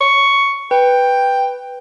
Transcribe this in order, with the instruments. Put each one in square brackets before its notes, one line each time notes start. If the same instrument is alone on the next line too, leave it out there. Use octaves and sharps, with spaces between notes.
[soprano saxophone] C#6
[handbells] B4 [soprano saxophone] G5